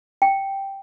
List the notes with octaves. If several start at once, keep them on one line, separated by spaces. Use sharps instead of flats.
G5